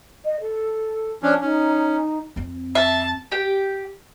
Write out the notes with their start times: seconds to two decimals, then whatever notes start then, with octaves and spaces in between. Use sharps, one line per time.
0.24 D#5
0.40 A4
1.23 F3 C#4 D4
1.41 C#4 D#4
2.36 F2 C4
2.75 E5 A5
3.32 G4 G5